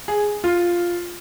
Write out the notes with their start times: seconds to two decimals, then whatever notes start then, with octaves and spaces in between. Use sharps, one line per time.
0.08 G#4
0.44 F4